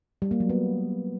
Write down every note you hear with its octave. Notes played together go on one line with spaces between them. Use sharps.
G3
A#3
F#3
B3